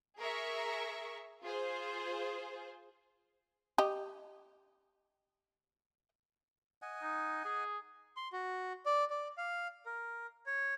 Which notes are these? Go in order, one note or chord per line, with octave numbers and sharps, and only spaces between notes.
G#4 A#4 E5 C#6
F4 G#4 C5
G4 D#5
D#5 F#5 G#5
D#4
G#4
C6
F#4
D5
D5
F5
A#4
C#5